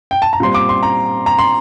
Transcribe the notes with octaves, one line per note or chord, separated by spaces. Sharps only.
G5
A5
A#5
A#2 G3 C4 C6
D6
C6
A#5
A#5
C6